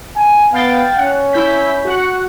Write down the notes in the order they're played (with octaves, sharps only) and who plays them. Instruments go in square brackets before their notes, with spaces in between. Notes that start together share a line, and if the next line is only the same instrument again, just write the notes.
[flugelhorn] G#5
[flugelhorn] B3 [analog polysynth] F5 G5 A6
[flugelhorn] C#4 [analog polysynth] F#5
[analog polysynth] E4 G6 B6
F#4 F#5